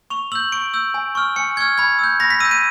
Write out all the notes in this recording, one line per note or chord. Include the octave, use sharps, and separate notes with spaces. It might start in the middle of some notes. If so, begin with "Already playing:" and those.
C#6 F7
E6 G6 F#7
C#6 D7
E6 G6
G#5
C#6 F6
G#5 C#7
C#6 F6 G#6
B5 G#6
E6 G6
B5 A#6
B6
E6 G6 D#7
D#7